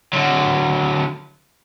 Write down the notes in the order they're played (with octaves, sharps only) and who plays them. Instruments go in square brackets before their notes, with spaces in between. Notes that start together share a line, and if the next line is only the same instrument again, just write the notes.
[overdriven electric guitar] D3 F#3